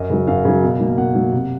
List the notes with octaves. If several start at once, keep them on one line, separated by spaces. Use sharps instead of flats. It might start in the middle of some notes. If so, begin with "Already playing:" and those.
Already playing: F#2 D#5
C#3 F#3
F#2 F5
C#3 F#3
B2
F#3 A#3
B2 F#5
F#3 A#3
C3